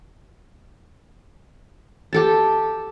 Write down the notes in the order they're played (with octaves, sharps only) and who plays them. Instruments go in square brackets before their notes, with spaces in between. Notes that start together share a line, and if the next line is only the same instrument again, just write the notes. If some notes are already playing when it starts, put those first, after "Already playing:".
[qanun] G4 A4 A5